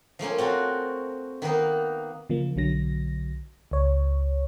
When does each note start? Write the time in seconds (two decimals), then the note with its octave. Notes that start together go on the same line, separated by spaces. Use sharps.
0.19 F3 A3 A#3 C#4
0.38 C4 F#4 A4 A#4
1.42 D#3 A#3 B3 D#4
2.29 C#3 F3 A#3
2.56 B1 D3 F#3 A#6
3.71 C#2 C#5